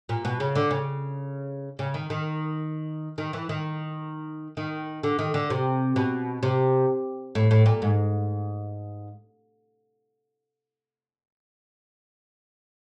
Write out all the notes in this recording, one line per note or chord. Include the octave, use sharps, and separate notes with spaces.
A#2
B2
C#3
D3
C#3
C#3
D#3
D#3
D#3
E3
D#3
D#3
D3
D#3
D3
C3
B2
C3
A2
A2
A#2
G#2